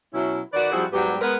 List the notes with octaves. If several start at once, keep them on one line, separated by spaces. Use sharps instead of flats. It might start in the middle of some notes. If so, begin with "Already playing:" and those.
B2 F#3 C#4 E4
D#3 F#4 B4 D5
F3 G3 C4 E4 F#4 G#4
G#2 F#3 G3 B3 G4
G#3 B3 A#4 B4